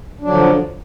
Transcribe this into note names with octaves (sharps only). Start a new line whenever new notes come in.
D3 F3 F#3 D4